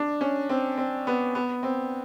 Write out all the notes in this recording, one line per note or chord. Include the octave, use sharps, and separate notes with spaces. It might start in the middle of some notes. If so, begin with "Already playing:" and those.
Already playing: D4
C#4
C4
C4
B3
B3
C4